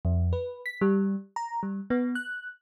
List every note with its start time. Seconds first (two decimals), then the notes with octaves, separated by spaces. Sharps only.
0.05 F2
0.33 B4
0.66 B6
0.81 G3
1.36 A#5
1.63 G3
1.90 B3
2.15 F#6